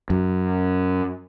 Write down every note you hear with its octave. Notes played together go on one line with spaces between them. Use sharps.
F#2